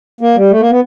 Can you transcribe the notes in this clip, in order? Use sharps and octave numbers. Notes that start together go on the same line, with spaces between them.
A#3
G3
A3
A#3
B3